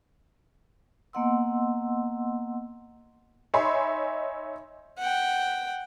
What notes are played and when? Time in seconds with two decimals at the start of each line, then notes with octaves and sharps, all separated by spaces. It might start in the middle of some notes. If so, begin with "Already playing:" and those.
1.13 A#3 B3 D#5 F#5 C6 E6
3.54 D#4 C#5 E5 G#5 B5 C6
4.98 F#5 G5